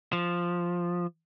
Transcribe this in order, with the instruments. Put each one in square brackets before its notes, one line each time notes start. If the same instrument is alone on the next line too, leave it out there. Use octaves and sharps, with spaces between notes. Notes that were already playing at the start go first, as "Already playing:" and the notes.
[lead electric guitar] F3